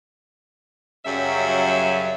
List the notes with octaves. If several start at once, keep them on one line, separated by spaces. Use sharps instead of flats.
F#2 C#3 F#3 G3 E5